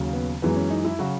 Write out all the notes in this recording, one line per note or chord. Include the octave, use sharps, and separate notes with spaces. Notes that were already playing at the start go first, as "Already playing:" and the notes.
Already playing: D#2 C#3 F#3
B3
F#2 E3 G#3 B3
C#4
D#4
E4
C#3 F#3 F#4